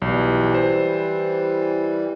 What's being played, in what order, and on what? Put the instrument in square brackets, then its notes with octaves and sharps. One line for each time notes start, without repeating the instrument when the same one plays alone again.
[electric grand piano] B1 [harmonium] E3 G3
[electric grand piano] C5